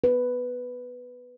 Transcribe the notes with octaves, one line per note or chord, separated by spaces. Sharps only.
B4